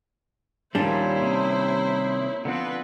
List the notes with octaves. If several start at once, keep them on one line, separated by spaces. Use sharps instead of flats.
D#2 A#2 G3 A#3 C#4 D4 E4 C5
C3 D#3
D3 F3 B3 C4 B4